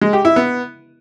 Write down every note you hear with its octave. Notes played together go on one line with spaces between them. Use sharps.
G#3
G4
E4
B3